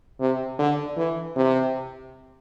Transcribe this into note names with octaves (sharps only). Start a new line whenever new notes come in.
C3
D3
E3
C3